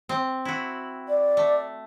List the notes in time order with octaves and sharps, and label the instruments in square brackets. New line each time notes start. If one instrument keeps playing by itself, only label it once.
[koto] C4
E4 F#4
[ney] D5
[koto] A3